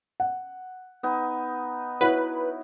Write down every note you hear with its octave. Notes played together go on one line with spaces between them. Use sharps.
F#5
B3 D#4
E4 F#4 B4 C#5